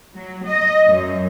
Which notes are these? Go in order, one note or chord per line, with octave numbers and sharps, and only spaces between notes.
F#3
D#5
F#2